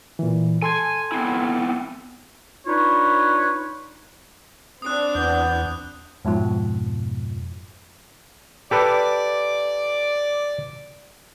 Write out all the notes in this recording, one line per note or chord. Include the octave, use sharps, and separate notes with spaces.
A#2 E3
A4 G#5 C6 G#6
B3 C4 E4
D4 D#4 F4 B4 C#5
C4 D4 D#6 F#6
E2 B3 G6
F2 G#2 B2 F3
G4 A4 B4 D5